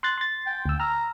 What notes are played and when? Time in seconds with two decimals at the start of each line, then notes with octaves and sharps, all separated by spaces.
0.03 C6 F#6 A6
0.18 C6 A6
0.46 G5
0.66 D2 E6
0.80 A#5 E6 F6